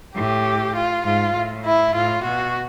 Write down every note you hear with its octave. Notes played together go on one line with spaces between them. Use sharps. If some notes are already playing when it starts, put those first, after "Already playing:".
A2 G4
F4
G#2 F4
A2
E4
A2 F4
B2 F#4